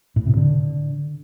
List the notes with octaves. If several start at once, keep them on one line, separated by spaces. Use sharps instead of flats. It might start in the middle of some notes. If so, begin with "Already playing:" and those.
A2
C3
D3